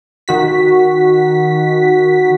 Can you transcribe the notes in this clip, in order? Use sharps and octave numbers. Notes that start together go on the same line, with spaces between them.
D#3 F#4 B6